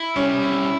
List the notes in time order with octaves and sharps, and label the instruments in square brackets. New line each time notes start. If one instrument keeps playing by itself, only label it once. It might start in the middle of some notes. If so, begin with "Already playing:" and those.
Already playing: [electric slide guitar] E4
[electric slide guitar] G3 [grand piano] C#4
[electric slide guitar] E4